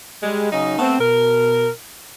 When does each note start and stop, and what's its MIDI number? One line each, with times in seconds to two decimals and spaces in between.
0.22 0.47 55
0.22 0.47 56
0.51 0.77 49
0.51 0.77 54
0.51 0.77 63
0.78 0.99 57
0.78 0.99 59
0.78 0.99 60
0.99 1.68 47
0.99 1.68 70